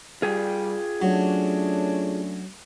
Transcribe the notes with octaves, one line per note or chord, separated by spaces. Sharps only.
G3 F4 G#4 G5
F#3 A3 C#4 D4